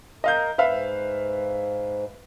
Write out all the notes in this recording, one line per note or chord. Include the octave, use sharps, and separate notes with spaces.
A#4 D#5 F5 G6
G#2 B4 E5 F5